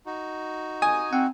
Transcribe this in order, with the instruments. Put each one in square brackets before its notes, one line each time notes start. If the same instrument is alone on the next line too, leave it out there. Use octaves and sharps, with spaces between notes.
[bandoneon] D#4 F#4
[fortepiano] G#5 [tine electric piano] D#6
[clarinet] C4 [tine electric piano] F#5